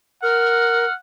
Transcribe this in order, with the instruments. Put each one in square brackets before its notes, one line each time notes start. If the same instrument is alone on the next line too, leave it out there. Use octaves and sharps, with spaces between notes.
[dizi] A#4 [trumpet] F#5 [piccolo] F6